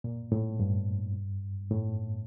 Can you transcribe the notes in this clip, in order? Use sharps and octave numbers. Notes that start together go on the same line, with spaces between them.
A#2
A2
G2
A2